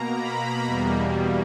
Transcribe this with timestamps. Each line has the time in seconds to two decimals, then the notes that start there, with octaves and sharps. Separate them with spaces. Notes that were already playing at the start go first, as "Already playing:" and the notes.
Already playing: B2 A#3 A#5
0.13 B5
0.65 E2 B2 G3 A#3